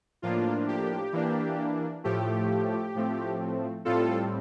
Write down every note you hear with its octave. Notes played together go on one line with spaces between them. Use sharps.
A2 F3 A#3 D4 F4
G4
E3 A#3 D4
A2 F3 A3 G4
A2 F3 A3 C4
A2 G3 C4 F4 A4